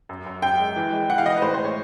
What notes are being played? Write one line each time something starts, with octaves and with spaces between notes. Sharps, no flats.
F#2
F#2
F#2 G5
G#3
E3
G#3
E3 F#5
F5
E3 D#5
B4
A2 C5
G#3 C5
C#5